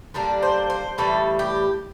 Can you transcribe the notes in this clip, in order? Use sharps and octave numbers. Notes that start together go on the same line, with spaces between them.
D3 G3 A#3 D4
C5
C5
A2 E3 G3 A4
G4